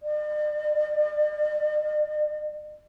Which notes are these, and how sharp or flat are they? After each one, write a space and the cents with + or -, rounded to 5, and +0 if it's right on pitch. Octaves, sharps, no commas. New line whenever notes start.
D5 +45